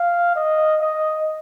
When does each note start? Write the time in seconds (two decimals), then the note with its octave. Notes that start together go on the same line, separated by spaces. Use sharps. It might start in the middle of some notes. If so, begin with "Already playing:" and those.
Already playing: F5
0.36 D#5
0.81 D#5